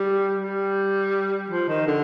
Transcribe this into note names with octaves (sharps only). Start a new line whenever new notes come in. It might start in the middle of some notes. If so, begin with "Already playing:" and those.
Already playing: G3
G3
F3
D#3
D3